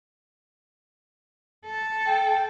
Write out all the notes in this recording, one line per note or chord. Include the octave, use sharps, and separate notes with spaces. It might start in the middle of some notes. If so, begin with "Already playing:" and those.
A4
G5